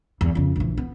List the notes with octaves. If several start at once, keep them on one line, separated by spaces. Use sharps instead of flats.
E2
F2 C#3
A#1 E3
B3